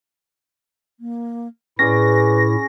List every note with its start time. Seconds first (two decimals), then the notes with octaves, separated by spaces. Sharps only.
1.00 A#3
1.79 A2 C#4 E4 G#4 B4 D5 A#6